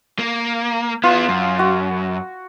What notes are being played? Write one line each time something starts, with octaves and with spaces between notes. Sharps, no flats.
A#3
B3 E4 F4
F#2
F#4